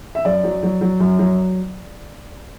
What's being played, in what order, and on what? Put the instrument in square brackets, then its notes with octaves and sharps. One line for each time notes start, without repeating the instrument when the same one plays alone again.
[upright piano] E5
F#2 D5
F#3
F#3
F#3
F#2
F#3